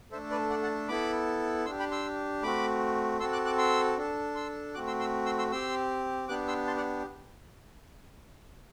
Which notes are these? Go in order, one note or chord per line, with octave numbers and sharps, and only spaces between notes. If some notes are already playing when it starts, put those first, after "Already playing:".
A3 D4 A4 C5 E5
B4 D5
D5 F#5
F#5 A5
B3 E4 A4 B5 D6
D4 G4 C6 E6
G5 B5
C6 E6
A3 C4 F#4 B5 D6
C4 F#4 A4 C6 E6
D6 F#6
D6 F#6
C6 E6
D4 A4
C6 E6
A3 C4 F#4 D6 F#6
C6 E6
C6 E6
C6 E6
C6 E6
C4 G4 C6 E6
B3 D4 G4 D6 F#6
C6 E6
A5 C6
D5 F#5